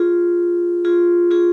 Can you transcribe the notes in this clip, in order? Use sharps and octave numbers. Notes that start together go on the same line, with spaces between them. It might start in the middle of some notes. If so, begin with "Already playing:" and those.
Already playing: F4 G#4
F4 G#4
F4 G#4